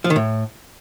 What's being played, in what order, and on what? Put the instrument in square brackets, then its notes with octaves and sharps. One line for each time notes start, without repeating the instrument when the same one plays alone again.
[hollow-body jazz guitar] F3
D#3
A2